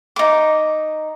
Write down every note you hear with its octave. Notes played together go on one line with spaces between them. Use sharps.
D#4 D6